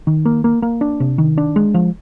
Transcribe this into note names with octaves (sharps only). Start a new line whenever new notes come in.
D#3
A#3
A#3
A#3
D4
C3
D#3
D4
G#3
F3